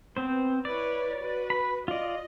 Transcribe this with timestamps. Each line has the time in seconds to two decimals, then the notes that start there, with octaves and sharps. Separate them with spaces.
0.17 B3 C4 C5
0.65 E4 B4 C#5 D5
1.20 F#4 B4
1.50 B5
1.88 F4 D5 D#5